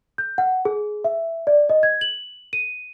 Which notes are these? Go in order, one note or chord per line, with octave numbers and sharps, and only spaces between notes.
G6
F#5
G#4
E5
D5
D#5
G#6
F#7
D#7